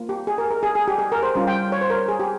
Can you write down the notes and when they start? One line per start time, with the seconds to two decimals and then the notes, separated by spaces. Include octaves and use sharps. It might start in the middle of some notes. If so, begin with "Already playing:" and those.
Already playing: A#3 F4
0.09 G4
0.27 G#4
0.38 A#4
0.51 A#4
0.63 G#4
0.75 G#4
0.88 G4
0.99 G#4
1.12 A#4
1.23 C5
1.35 G3 C#4 F4 A#4
1.47 G5
1.72 C#5
1.81 C5
1.90 A#4
2.08 G#4
2.20 G4